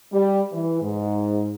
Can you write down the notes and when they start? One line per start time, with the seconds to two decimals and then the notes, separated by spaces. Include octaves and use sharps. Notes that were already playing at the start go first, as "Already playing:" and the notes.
0.13 G3
0.53 E3
0.82 G#2